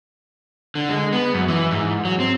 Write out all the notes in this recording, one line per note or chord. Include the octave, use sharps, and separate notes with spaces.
D3
G#3
B3
F#2
E3
G#2
F#3
C4